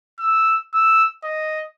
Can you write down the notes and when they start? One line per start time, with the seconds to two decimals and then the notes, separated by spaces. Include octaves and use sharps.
0.19 E6
0.74 E6
1.24 D#5